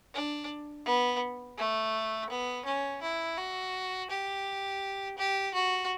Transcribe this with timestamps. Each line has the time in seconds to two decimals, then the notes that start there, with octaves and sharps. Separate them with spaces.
0.14 D4
0.85 B3
1.58 A3
2.30 B3
2.65 C#4
3.02 E4
3.38 F#4
4.11 G4
5.18 G4
5.55 F#4